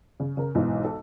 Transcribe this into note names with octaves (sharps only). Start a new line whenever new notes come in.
C#3
C#3 A#4
B1 G#2 E3
A4